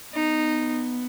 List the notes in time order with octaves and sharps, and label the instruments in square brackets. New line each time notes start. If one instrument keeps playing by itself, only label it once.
[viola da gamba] B3 [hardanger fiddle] D#4